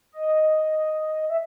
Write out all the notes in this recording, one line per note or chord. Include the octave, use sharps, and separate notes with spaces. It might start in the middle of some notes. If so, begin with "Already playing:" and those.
D#5
E5